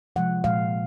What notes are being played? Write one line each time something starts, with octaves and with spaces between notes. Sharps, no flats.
C3 F3 G#3 F#5
A#2 F3 G#3 F5